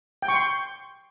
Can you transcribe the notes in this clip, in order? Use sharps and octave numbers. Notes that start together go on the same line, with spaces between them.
G5
C#6
C6